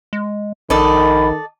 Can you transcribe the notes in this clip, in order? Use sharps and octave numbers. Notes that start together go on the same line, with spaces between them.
G#3
A#1 D#3 A4 D5 D#5 B5